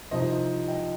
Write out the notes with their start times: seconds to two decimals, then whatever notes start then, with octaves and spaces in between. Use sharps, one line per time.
0.11 C2 C3 F3 C4 D#4 C5 D#5
0.68 D#5 G5